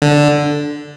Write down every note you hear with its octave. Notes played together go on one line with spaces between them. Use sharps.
D3